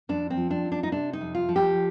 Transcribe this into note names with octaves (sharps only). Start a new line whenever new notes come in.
F2 D4
C4
F3
D4
C4
D4
D#4
C3 D4
D#4
F2
F4
F3
G4